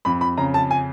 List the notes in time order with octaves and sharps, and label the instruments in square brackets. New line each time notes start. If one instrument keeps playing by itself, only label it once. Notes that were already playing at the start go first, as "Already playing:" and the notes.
[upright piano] F2 [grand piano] B5
[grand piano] B5
[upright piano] C#3 [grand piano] A#5
[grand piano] A5
G#5